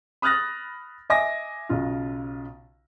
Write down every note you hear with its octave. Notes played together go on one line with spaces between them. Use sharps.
B5 D#6 F6 F#6 A6 A#6
D#5 E5 G#5 D6 A#6
B1 C#3 F4